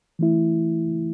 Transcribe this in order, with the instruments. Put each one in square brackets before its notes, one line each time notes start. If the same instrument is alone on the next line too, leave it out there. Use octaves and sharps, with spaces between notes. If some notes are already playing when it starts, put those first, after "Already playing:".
[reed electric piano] E3 A3 E4